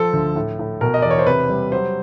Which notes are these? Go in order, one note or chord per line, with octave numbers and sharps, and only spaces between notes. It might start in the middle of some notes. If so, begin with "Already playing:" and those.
Already playing: F3 A4
D2
A2
A2
B2 A#4
D#5
E2 D5
C#5
C5
C3 B4
G3
F#3 C5